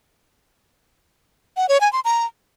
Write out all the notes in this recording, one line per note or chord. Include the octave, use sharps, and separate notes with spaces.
F#5
C#5
G#5
C6
A#5